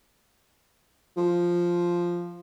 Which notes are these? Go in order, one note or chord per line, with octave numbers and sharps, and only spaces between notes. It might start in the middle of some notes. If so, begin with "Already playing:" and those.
F3